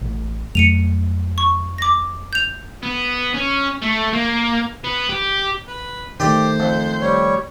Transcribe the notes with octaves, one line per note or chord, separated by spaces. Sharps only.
A1
F2 F#3 A3 C#7 D#7 F7
C#6
D6 A#6
G6 F7
B3
C#4
A3
A#3
B3
G4
B4
D#3 A3 G4 C5 D5 G5
F2
G3 C#5